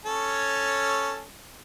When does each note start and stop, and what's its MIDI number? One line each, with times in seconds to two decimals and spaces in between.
0.05 1.25 61
0.05 1.25 69
0.05 1.25 73